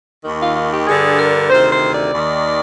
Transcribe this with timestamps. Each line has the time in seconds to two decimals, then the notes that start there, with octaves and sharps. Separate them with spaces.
0.24 D#2 D#3
0.41 F4
0.56 F4
0.71 G4
0.87 G2 D3 G#4
1.19 A#4
1.50 D2 C3 D#3 C5
1.71 C5
1.92 D5
2.13 D#2 D#3